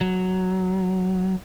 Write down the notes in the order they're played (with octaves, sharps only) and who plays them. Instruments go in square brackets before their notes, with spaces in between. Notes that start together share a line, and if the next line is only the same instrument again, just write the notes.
[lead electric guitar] F#3